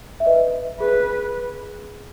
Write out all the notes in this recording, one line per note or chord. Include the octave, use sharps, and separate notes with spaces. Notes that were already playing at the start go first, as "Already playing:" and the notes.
E5
B4 D#5
G#4 B4